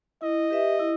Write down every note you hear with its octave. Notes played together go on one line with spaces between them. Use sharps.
E4 D#5
G4 B4 E5
E4